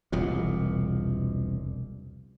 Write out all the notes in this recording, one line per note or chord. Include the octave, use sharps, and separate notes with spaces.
E1 C2 A#2 F3